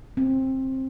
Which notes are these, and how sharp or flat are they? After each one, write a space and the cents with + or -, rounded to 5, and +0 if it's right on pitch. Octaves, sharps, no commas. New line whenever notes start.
C4 +15